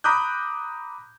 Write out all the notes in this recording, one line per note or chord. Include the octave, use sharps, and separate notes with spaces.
A#5 B5 D6 D#6 F#6 G6